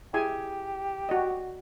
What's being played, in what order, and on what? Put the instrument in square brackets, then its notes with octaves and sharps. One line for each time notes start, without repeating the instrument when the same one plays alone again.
[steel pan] E4 G#4 G#5 [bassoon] G4
[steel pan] F#4 D5 D#5